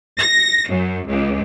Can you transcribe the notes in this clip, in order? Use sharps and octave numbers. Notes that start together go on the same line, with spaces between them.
A#6
F#2
C#2